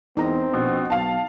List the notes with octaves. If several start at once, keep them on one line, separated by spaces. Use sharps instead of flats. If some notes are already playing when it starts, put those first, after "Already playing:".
E2 C4 D#4 D#5 A#5
A#1 B2
B1 F5 A5